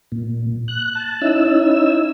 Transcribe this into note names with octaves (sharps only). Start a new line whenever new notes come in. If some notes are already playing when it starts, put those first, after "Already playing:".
A#2
F#6
A5
C#4 D#4 E4 E6